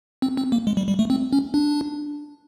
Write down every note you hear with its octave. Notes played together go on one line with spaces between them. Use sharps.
C4
C4
A#3
G#3
G3
G3
A3
C4
C#4
D4